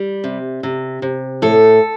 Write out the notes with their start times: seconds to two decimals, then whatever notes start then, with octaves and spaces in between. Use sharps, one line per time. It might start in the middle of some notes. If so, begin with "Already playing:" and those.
Already playing: G3
0.24 C3
0.63 C3
1.02 C3
1.42 A2 A4